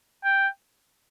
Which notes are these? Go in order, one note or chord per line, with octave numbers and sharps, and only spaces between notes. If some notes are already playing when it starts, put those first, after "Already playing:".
G5